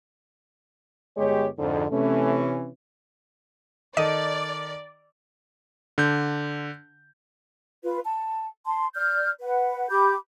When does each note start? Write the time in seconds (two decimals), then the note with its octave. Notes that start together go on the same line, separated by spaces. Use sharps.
1.17 G1 G#3 G4 C#5
1.58 F2 G#2 D3
1.91 C3 E3 A3 C#4
3.97 D#3 D#4 A4 D5 D#5
5.98 D3 G6
7.83 F4 B4
8.04 A5
8.65 A5 C6
8.95 D5 F6 G6
9.41 B4 F#5
9.89 G4 B5 D6 G6